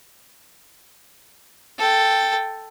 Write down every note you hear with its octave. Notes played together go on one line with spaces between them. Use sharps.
A4 G5